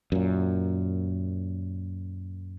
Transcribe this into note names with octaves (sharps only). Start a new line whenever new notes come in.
F#2 A#2